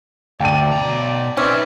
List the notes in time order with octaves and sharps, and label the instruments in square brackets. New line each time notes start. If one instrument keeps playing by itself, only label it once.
[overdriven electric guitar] D2 [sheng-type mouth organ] D5 [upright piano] G5 A5 D#7
[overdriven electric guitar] B2 A#5
[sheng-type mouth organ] C4 D5 E5 [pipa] C#4 [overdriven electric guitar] D#4 B4